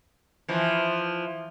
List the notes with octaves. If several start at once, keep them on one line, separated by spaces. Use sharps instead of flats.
E3 F3